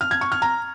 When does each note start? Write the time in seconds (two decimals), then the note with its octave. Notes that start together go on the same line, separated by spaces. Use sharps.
0.01 F6
0.11 G#6
0.21 C#6
0.32 F6
0.42 A#5